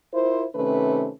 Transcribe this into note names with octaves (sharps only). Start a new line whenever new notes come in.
E4 F4 A#4 C5
C3 D#3 A3 C#4 B4